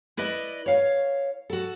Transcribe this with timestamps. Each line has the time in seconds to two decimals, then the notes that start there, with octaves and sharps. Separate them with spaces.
0.17 E4 B4 D5 D#5
0.66 C#5 F5
1.50 F#4 A4